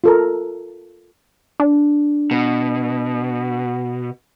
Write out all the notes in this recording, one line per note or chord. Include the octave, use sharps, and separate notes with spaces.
F4 A4 A#4
D4
B2